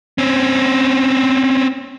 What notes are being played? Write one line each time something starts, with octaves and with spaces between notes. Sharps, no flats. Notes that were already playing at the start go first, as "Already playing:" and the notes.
C4 C#4